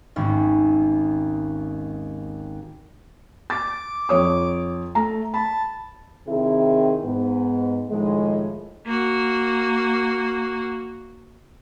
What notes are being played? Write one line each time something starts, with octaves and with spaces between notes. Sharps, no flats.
G#1 D#2 C#4
D6 A6
F2 C#5 D#6
A3 A#5
A5 B5
C3 D#3 C4 E4 G#4
G#2 B3
A2 D#3 F3 G#3
A#3 F#4